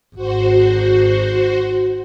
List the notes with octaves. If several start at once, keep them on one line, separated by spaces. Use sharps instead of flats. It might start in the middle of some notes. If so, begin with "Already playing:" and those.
G#1 F#4 C5